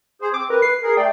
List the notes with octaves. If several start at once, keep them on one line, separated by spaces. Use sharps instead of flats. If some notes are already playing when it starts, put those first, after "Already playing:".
G#4 C5
C4 D6
A#4 B4
C7
G#4 A#4
A3 D5 G5